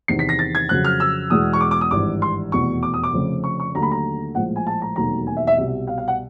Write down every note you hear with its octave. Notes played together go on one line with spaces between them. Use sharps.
E2 C3 D#3 C7
B6
A#6
A6
G#6
F2 C#3 F#3 F#6
F6
E6
E2 B2 G#3 D#6
C#6
D6
D6
D#6
G#1 G2 E3 D6
C6
F1 E2 B2 C#6
D6
D#6
D6
F1 F2 C#3
C#6
C#6
D#2 D3 F#3 A3 A#5
B5
A#5
A#1 A2 F3 G#3 F#5
G#5
A5
A#5
E1 D#2 D#3 F#3 A3 A#5
G#5
E5
E5
C2 B2 G3 E5
F5
F5
F#5